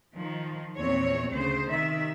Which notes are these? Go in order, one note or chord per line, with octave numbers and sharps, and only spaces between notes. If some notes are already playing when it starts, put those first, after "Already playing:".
D#3 F3
E2 A#2 C4 C#5
D2 C#3 C5
C3 D#3 E5